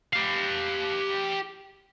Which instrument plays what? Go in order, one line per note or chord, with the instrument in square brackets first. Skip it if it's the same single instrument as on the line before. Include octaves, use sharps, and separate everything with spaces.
[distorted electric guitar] G4 F5